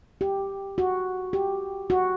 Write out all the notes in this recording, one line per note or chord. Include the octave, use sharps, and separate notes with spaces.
G4
F#4
G4
F#4